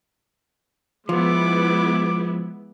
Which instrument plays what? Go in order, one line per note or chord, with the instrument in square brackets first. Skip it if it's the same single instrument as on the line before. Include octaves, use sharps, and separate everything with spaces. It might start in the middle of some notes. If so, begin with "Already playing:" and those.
[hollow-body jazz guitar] F3 [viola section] G#3 B3 E4 [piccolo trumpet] D6